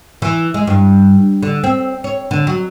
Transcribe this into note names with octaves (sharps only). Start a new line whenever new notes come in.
E3
G#3
G2
D3
C4
C#5
D3
F#3